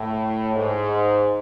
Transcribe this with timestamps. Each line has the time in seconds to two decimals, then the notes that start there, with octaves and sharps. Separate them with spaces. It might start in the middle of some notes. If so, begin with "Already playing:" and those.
Already playing: A2
0.55 G#2